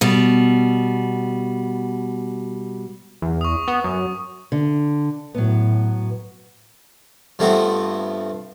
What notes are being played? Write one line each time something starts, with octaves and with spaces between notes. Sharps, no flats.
B2 G3
E2
C#6 D#6
B3
F#2
D3
A2 F#3 B3
G2 F3 A3 B3 C4